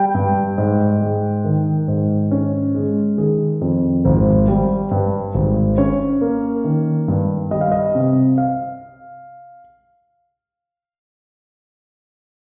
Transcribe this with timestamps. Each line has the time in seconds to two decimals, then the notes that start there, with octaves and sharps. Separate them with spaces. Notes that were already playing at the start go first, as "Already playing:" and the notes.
Already playing: G3 G5
0.15 G2
0.58 G#2
1.01 G#3
1.45 D#3
1.88 G#2
2.31 C#4
2.75 G#3
3.18 D#3 G#4
3.61 F2
4.05 G#1 C5
4.48 G3
4.91 G2
5.34 G#1
5.78 C#4 C#5
6.21 A#3
6.64 D#3
7.08 G2
7.51 G3 D#5
7.61 F5
7.72 D#5
7.95 C3
8.38 F5